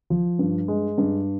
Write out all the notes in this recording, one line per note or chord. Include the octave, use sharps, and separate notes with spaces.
F3
G2
G#3
G2